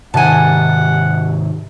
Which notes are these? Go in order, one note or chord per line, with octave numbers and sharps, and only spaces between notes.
G#2 C3 D#3 F#5 G#5 A5